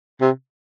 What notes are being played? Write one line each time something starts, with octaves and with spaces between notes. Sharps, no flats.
C3